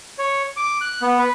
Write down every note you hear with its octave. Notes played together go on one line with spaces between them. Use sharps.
C#5
D6
F#6
B3
B4